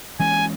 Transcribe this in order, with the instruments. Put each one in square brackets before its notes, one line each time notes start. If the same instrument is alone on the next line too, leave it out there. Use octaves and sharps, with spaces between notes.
[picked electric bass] E3 G#3 C#4 [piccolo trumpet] G#5